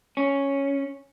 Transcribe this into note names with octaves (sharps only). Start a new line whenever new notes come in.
C#4